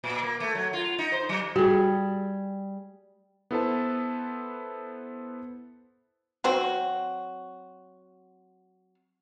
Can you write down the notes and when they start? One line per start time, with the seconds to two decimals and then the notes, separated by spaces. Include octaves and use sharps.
0.04 A#2
0.23 A#3
0.40 A3
0.55 F#3
0.73 F4
0.99 D#4
1.12 C5
1.29 F#3
1.56 G3 F#4 G#4
3.51 B3 E4 A4 B4 C5 A5
6.44 F#3 C4 F#4